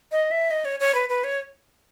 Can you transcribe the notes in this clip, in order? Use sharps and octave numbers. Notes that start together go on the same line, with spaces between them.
D#5
E5
D#5
C#5
C#5
B4
B4
C#5